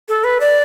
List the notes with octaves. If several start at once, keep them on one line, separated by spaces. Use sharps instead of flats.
A4
B4
D5